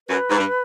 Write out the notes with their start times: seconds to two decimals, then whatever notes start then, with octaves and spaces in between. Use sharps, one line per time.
0.08 F#2 B4
0.30 G#2
0.37 G2